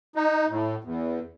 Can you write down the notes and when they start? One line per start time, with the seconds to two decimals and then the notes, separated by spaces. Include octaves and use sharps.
0.15 D#4
0.49 A2
0.84 E2